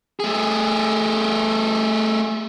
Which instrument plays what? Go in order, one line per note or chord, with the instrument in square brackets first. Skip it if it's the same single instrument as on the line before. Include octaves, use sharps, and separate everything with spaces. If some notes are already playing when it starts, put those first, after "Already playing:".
[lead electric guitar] A3 G#4